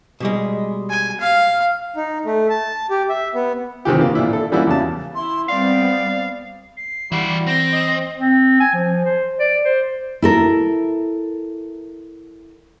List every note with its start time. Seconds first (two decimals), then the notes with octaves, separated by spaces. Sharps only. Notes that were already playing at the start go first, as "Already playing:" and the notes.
0.20 B2 G3 G#3
0.90 G#5
1.20 F5
1.96 D#4
2.25 A3
2.50 A5
2.90 G4
3.09 E5
3.34 B3
3.85 C3 D#3 E3 G4
3.99 D3 E3 A#3
4.15 A#2 D4 E4
4.32 D4 A4
4.52 E3 G3 A#3 C#4 E4 F#4
4.67 E2 C#3 A5
5.15 E4 C6
5.49 G3 B3 C4 D5 F5
6.77 C7
7.12 E3 G3 E4 F#4
7.47 C4 A#6
7.72 D#5
8.18 C4
8.60 G#5
8.74 F3
9.05 C5
9.40 D5
9.64 C5
10.22 E4 A4 A#4